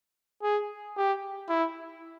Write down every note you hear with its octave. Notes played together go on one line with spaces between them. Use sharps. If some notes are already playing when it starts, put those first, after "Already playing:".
G#4
G4
E4